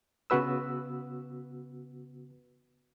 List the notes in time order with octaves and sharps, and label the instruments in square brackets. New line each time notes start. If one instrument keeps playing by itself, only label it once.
[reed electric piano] C#3 B3 F#4 B4 E6